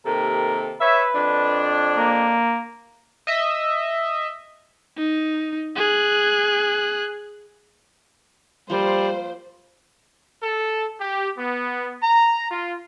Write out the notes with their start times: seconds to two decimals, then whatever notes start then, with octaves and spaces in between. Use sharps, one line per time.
0.06 D#2 C3 A4 A#4
0.81 B4 C#5 E5
1.14 F2 D4
1.97 A#3
3.27 D#5 E5
4.98 D#4
5.76 G#4 F#6
8.70 F3 G3 A#3 F4 C5
10.43 A4
11.00 G4
11.38 B3
12.02 A#5
12.51 F4